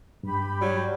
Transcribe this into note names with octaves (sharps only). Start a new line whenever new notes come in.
G2 G4 B5
F#3 G3